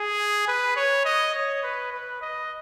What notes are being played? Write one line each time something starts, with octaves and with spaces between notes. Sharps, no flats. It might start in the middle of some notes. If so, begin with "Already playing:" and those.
Already playing: G#4
B4
C#5
D#5
C#5
B4
B4
D#5